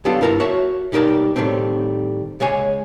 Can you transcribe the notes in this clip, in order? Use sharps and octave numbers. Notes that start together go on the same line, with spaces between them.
F#3 G3 B3 D4 F4 A4
G2 E4 A#4 A5 A#5
F#4 C#5 E5 A5
B1 G3 D#4 A#4 A5
A2 D#3 G3 A3 C4
C#2 G#3 C#5 G#5